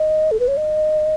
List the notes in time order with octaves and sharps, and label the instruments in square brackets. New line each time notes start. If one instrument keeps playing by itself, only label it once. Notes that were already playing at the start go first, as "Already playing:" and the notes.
Already playing: [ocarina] D#5
A4
B4
C#5
D#5